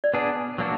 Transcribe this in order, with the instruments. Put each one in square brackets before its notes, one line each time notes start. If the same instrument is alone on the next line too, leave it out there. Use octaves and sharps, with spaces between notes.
[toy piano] D5
[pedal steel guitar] B3 D4 G#4 [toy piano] B4
[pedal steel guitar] F#3 A#3 D4 F#4